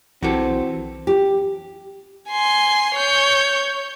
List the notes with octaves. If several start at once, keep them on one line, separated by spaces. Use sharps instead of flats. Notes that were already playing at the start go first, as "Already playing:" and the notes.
B1 E3 C4 F#4 G4 A4
G4
G#5 C6
C#5 G6